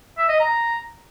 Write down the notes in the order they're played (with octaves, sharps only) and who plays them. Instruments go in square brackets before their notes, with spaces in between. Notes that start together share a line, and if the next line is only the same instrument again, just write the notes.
[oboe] E5
D#5
A#5